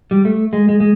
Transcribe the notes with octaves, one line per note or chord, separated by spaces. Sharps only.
G3
A3
G#3
G#3
G#3